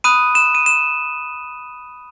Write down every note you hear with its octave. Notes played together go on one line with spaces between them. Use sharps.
B5 D#6 F#6 D#7
E7
D#7
E7